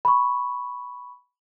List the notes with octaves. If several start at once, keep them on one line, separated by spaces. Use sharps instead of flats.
B5 C#6